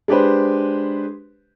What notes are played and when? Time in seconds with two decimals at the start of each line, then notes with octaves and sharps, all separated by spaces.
0.08 G#3 D4 G4 B4 C5